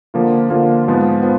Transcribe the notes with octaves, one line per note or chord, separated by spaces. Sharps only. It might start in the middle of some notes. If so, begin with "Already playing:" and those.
D3 F3 A#3 F4
D3 F3 A#3 F4
G#2 F3 G#3 B3
F3 B3